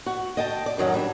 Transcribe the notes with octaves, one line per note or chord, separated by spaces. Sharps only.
F#4
D#5 G5 A5
D5
F#2 D#3 F#3
G3 D4